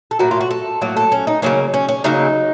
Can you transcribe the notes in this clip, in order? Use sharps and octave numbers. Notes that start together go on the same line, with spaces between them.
A4
A2 F#3 A#3 F#4
F4
F#4
A4
A2 F#3 A#3 F#4
A4
C#4
D#4
C#3 F#3 A#3 C#4
C#4
C#4
C#3 F#3 A#3 D#4